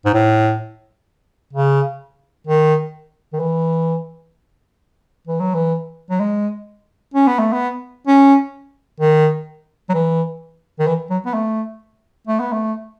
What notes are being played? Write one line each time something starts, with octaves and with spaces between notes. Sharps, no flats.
G#2
A2
C#3
D#3
D#3
E3
E3
F#3
E3
F#3
G#3
C#4
B3
A3
B3
C#4
D#3
F#3
E3
D#3
E3
F#3
B3
A3
A3
B3
A3